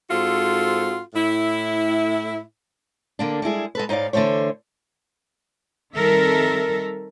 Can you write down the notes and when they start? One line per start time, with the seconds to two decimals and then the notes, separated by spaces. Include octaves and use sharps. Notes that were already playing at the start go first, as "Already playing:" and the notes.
0.10 G#2 C4 F4 F#4 A4
1.14 A2 E4
3.19 D3 A#3 D4
3.42 G3 G#3 E4 G#4
3.75 G#3 A4 B4
3.89 G#2 D#4 C#5 D5 F5
4.13 D3 E3 A3 C5 C#5
5.94 D#3 G3 C4 A4 A#4 E5